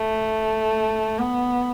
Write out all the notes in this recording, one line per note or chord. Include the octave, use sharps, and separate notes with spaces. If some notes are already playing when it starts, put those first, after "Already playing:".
Already playing: A3
B3